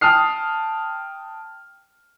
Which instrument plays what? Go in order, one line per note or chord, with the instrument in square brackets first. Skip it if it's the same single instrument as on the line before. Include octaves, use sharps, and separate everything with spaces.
[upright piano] G5 A5 D#6 F6 C7